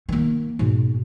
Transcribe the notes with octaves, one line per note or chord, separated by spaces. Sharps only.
D#3 A#3
G#2 B2